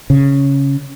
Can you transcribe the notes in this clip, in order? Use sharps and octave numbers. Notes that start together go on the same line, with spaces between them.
C#3